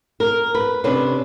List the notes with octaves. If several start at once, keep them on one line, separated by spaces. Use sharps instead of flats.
A#4
B4
C3 C#4 D4 B4